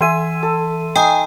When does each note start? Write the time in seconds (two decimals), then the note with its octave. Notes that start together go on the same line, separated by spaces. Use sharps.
0.01 E3 E5 G#5 C6 D#7
0.43 A4
0.96 D#4 G5 G#5 D#6